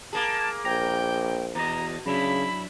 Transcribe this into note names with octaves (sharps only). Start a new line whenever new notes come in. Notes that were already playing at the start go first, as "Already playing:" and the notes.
A#3 G#4 A5
A#1 G5 A#5
E2 B2 D#5 A#5
C#3 F#3 D4 E4 B5